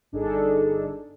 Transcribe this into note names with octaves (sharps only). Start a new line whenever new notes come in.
G1 D4 D#4 G#4 A4